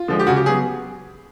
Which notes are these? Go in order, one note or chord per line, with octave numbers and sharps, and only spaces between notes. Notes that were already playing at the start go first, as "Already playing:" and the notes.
Already playing: F4
D3 F3 G#3
G4
C#3 F#4
G4
F#3 B3 G#4